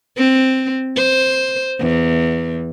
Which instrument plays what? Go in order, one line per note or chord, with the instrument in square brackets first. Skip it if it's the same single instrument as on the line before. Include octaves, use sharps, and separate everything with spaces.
[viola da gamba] C4
C5
E2